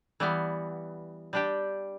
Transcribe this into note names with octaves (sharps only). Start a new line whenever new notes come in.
E3 G3 B3
G3 D4 G4